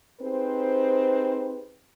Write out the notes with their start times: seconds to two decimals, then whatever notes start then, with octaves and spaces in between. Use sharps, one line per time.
0.20 C4 D#4 G4 G#4 B4 C5